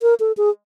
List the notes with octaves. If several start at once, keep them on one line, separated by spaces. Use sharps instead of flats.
A#4
A4
G#4